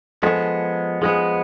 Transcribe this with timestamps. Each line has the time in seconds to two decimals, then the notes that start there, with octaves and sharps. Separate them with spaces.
0.22 F3 G#3 B3 A4
1.02 F3 G#3 B3 G#4